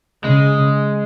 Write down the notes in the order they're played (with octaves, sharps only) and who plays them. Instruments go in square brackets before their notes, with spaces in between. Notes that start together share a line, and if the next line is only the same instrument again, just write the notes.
[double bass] C#3 [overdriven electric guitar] G#3